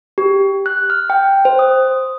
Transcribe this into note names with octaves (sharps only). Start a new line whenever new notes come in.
G4
F#6
F6
G5
C5
D#6